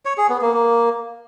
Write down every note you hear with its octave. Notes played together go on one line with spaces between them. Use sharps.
C#5
G#4
B3
A#3
A#3